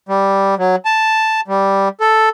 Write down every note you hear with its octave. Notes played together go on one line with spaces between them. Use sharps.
G3
F#3
A5
G3
A4